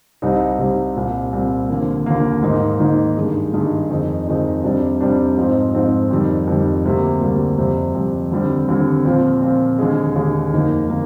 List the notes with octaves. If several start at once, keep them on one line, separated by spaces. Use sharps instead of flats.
C2 C3 G3 C4 D#4
C2 C3 G3 C4 D#4
C2 A#2 G3 C4
C2 A#2 G3 C4
D#2 D3 F3 A#3
D#2 D3 F3 A#3
G#2 D#3 A#3 D#4
G#2 D#3 A#3 D#4
G2 D#3 G#3
G2 D#3 G#3
F2 D#3 G#3 D#4
F2 D#3 G#3 D#4
F2 C3 G3 D4
F2 C3 G3 D4
G#2 F3 C4 D#4
G#2 F3 C4 D#4
F2 D#3 G3
F2 D#3 G3
D2 C3 G3 A#3
D2 C3 G3 A#3
F2 C3 G3
F2 C3 G3
D#2 D3 G3 C4
D#2 D3 G3 C4
A#2 F3 C4
A#2 F3 C4
D#2 D3 G#3
D#2 D3 G#3
F2 D#3 A#3
D#3 A#3